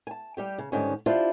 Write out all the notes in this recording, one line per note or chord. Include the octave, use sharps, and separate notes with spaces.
G#5 A5
G3 G4 G5
C#3
G#2 D3 D#3 G3 C#4
D4 E4 F4 G4 C5 D5